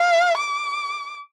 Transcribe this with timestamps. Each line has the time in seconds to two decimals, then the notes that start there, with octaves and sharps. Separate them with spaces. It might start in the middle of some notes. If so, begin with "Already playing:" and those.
Already playing: F5
0.38 D6